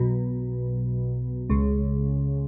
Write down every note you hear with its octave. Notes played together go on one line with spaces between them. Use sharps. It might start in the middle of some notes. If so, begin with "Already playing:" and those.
Already playing: B1 B2
C#2 C#3